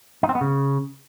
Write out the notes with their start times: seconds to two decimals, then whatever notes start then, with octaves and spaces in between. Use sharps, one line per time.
0.23 D#4
0.29 C4
0.35 B3
0.41 C#3